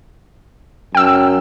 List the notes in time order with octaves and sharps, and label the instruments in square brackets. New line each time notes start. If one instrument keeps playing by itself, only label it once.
[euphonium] F#2 [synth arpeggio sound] G5 E6